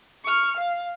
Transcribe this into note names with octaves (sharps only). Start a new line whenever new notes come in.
C#6 F6
F5